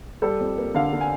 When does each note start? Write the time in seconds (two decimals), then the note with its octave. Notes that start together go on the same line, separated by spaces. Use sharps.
0.22 G3 A4
0.40 F2
0.58 A#3
0.75 D3 F5
0.93 D3
1.01 G#5